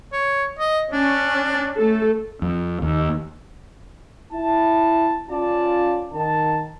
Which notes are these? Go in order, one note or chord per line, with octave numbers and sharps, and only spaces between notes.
C#5
D#5
C#4 D4
A3 A4
F2
D#2
E4 A5
C#4 F4 D5 A5
D#3 A5